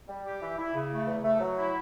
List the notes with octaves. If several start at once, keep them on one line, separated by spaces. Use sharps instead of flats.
G3
G4
E3
E4
C#3
A3
E2
A3
F#3
E4